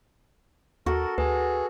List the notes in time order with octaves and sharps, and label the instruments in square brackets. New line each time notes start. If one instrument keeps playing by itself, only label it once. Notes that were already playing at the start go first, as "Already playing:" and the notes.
[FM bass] D#2 [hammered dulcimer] F#4 A4 [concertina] A#4
[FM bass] D2 [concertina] G#4 [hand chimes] B4